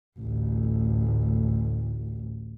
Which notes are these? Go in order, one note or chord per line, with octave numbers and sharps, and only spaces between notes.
A1 D2